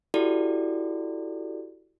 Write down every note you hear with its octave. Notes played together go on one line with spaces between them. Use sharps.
E4 F#4 G4 A4 D5